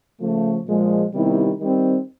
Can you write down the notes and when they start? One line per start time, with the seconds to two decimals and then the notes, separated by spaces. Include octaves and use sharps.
0.20 C#3 F3 A3
0.66 A#2 F3 G#3
1.13 C3 D#3 G3 B3 E4
1.59 D#3 G3 C4